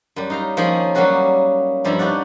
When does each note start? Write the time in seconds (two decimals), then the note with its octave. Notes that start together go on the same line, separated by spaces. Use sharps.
0.16 F#2 G3
0.30 D#4 F5 A#5
0.57 D#3 F3 A#3 C#4 G#4 B5
0.95 F#3 G3 A#3 C#4 F#4 G#4
1.84 G2 F3 G3 E4 A#5 B5
1.99 D4 D#4 C#5 D5 F#5